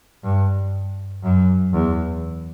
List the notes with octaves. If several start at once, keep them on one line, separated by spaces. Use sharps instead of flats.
G2
F#2
E2